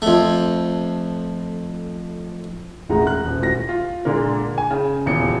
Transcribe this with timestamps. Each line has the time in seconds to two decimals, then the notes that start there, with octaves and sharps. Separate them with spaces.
0.02 F2 A3
2.89 E1 A1 A2 G#3 F#5 A#5
3.07 F#6
3.24 D#1
3.40 D#1 D2 E4 F#4 A#6
3.69 F4
4.05 A#2 D3 G#3 A#3
4.58 G#5
4.70 C#3
5.06 D#1 E2 C#7